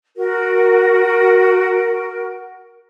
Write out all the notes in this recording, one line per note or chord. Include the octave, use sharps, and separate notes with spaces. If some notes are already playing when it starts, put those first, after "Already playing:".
F#4 A#4